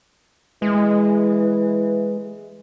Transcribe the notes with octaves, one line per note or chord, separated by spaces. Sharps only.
E3 G#3